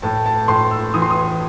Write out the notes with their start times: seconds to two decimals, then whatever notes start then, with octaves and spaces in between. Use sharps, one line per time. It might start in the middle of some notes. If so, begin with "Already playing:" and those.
0.02 A2 A5
0.26 A5
0.48 A2 C6
0.71 E6
0.94 E3 D#6
1.02 C6
1.10 D#6